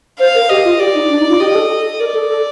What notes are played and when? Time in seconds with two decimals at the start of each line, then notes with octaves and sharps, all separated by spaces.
0.20 C5 F5
0.35 A#4
0.49 G4 D#5
0.65 F4
0.79 G4 D5
0.95 D#4
1.09 D4
1.20 D#4
1.29 F4
1.39 G4 D#5
1.50 G4
1.55 A4
1.70 A4
1.99 A#4 D5
2.14 A4
2.29 A4